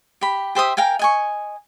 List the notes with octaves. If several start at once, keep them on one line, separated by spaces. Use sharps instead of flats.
G4 B5
G4 C5 E5 D#6
A#4 F5 G5 G#5
D#5 G#5 C#6